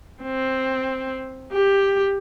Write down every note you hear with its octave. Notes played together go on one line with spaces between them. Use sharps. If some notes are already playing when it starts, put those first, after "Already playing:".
C4
G4